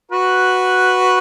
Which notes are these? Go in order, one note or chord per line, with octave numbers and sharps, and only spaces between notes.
F#4 B4